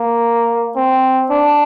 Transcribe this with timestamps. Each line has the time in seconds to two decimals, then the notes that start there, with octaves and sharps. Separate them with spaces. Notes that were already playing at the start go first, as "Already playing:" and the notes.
Already playing: A#3
0.76 C4
1.30 D4